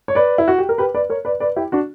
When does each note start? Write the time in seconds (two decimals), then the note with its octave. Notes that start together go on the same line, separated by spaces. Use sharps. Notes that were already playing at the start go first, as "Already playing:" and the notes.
0.08 C#5
0.15 B4 D5
0.38 E4
0.48 F#4
0.58 G4
0.69 A#4
0.78 G4 B4
0.95 B4 D5
1.10 A#4 C#5
1.25 B4 D5
1.40 B4 D5
1.56 E4 G4
1.72 D4 F#4